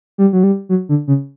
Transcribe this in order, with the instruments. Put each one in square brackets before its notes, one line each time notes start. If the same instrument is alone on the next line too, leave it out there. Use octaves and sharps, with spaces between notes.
[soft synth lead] G3
F#3
G3
F#3
D3
C#3